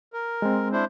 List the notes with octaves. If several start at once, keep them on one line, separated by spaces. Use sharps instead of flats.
A#4
G#3 C4
D4 E4 C5